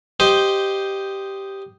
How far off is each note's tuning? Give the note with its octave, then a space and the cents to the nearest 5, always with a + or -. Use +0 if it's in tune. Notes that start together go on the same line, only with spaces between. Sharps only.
G4 -5 C5 +0 D#5 +0